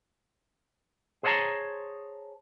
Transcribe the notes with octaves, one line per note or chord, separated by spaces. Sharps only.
G#4 C5 C#5 D#5 A5 A#5